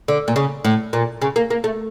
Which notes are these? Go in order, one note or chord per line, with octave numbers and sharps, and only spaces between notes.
D3
A#2
C#3
A2
A#2
C#3
A#3
A#3
A3